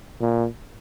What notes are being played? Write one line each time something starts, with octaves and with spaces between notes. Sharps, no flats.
A#2